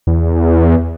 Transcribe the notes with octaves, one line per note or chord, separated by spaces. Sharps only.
E2